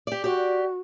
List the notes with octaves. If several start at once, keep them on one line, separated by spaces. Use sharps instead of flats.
G4 D5
F#4 G4 D5